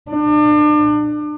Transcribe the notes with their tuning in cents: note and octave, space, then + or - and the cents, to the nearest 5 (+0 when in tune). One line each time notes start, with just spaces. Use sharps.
D4 +35